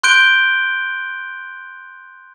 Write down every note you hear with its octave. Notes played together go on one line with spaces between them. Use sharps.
C6 F#6 G6 D7 G7